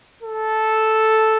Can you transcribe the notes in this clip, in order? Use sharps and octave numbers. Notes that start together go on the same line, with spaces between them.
A4